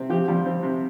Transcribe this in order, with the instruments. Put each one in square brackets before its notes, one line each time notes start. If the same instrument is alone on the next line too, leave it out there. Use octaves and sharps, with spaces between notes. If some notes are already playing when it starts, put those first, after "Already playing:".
Already playing: [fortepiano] C3 C4
[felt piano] F3 [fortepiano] G4
[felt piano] F3 [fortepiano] G3
[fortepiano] C4
C3